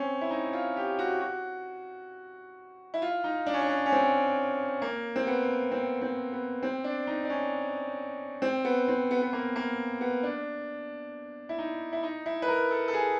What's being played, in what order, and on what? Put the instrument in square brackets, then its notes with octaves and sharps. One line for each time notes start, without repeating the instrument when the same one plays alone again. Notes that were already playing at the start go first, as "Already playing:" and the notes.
Already playing: [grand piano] C4 C#4
E4
D#4
F4
G4
F#4
F#4
E4
F4
D#4
D4
C#4
D4
C#4
C#4
C4
A#3
C4
B3
C4
C4
B3
C4
D4
D#4
D4
C#4
C4
B3
C4
B3
B3
A#3
A#3
B3
D4
E4
D#4
E4
D#4
E4
B4
A#4
A4
A4
G#4